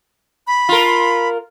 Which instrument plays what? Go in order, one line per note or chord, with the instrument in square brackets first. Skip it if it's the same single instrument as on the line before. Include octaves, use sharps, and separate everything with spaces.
[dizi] B5
[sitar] F4 A#4